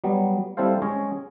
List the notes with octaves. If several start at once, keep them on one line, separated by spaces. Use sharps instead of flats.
F#3 G3 B3
G3 C4 E4 A4 C5 F5
G#3 C#4 C#5 D#5